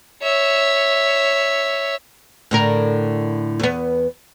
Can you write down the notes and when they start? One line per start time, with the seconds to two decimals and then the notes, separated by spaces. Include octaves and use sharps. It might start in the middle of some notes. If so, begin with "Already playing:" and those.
0.23 C#5 E5
2.51 A2 D3 A#4
3.59 E2 B3